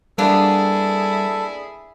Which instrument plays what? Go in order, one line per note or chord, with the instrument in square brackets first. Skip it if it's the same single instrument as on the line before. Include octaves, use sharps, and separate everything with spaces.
[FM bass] G3 [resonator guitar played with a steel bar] A#3 B3 D4 [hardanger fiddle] E4 G#4 [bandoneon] A4